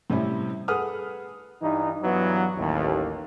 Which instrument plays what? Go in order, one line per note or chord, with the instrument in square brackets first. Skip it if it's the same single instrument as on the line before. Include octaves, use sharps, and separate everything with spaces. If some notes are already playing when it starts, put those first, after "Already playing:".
[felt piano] A2 C3 G3 C#4 E4
G#4 A4 B4 F#5 D#6 F6
[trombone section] G2 E3 D#4
G2 E3 F#3 B3
A1 D#2